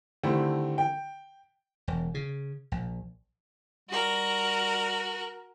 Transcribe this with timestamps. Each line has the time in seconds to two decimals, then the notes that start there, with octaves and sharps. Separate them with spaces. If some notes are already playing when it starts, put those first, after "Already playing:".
0.23 D3 D#3 G3 A3 C4 E4
0.78 G5
1.88 E1
2.14 C#3
2.72 A#1
3.90 G3 F#4 A#4